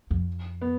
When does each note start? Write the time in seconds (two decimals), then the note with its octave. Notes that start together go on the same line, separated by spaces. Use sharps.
0.11 F2
0.61 B3